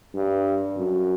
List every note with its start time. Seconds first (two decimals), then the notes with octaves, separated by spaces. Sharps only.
0.14 G2
0.77 F#2